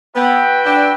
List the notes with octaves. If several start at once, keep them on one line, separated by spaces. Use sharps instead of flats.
B3 F#4 B4 E5 G5
D4